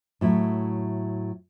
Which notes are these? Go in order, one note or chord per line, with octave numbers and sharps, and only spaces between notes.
A2 F#3 E4